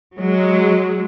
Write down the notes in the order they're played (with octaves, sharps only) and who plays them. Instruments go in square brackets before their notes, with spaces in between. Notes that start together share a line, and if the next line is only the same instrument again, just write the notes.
[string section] F#3 G#3